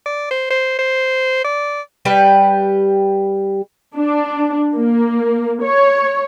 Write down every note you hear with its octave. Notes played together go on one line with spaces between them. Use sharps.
D5
C5
C5
C5
D5
G3 G4 B4
D4
A#3
C#5